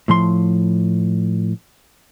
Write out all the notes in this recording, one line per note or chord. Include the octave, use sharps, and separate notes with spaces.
A2 F3 C6